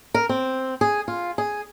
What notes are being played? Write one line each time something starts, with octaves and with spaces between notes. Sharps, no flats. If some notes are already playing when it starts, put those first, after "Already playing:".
A#4
C4
G#4
F4
G#4